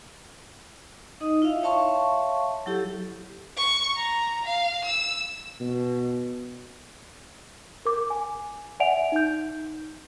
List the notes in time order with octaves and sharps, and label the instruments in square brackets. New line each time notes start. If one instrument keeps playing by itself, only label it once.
[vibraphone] D#4 D#5 D#6
E4 F4 E5 F5
C#5 E5 F5 A5 C6 C#6
F#3 E4 G4 A4
[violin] C#6
A#5
F5
E6
[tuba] B2
[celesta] A#4 D6
G#5
D5 E5 F#5 G#5 D7 F7
D#4 G6